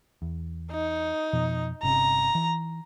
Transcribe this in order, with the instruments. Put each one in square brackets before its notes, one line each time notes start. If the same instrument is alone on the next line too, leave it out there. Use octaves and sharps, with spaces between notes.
[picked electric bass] E2
[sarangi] D#4
[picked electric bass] F2 B2 F3
[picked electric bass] G1 C3 C#4 [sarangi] A#5
[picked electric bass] E3